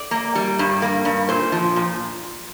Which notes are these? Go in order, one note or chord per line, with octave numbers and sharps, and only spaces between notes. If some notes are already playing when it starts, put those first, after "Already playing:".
Already playing: D5
A#3
G3
G2
A#3
G2
A#2 C5
F3
A#2